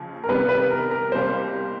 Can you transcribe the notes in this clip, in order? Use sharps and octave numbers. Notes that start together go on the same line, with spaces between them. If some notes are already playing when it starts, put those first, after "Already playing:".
Already playing: D#2 C#3 F3
A#4
C2 C3 D#3 G3 B3 B4
B4
A#4
A#4
C2 B2 G3 A#3 C5